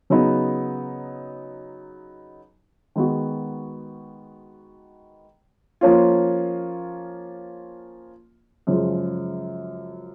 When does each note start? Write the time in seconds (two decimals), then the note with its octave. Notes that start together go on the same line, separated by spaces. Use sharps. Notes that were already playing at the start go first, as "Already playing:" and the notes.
0.10 C#3 F#3 B3 D#4
2.96 D#3 G#3 B3 F#4
5.81 F3 A#3 C#4 F4
8.67 F#2 C#3 F3 G#3